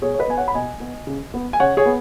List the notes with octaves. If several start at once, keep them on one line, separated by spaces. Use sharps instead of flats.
B2 G#4 C#5
C#5
B4 D#5
B3 G#5
C#5 F#5
B5
B2 D#5 G#5
B3
C#3
B3
G#5
C#3 C#5 F#5
G#4 C#5
B3